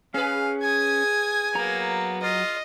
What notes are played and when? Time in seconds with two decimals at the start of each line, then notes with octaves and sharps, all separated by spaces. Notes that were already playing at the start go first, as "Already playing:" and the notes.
0.14 C#4 G#4 B4 F5
0.63 G#5 D#6 G#6
1.55 F#3 A#3 B3 A#5
2.23 F4 D#5